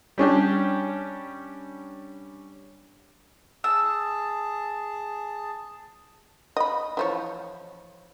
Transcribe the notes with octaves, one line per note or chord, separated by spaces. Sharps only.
G3 C#4 D4 G4
G#4 A5 E6
D#5 B5
E3 F3 C#5